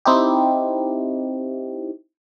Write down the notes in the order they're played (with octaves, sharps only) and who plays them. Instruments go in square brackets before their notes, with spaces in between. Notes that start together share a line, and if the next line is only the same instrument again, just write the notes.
[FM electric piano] C4 D#4 E4 G4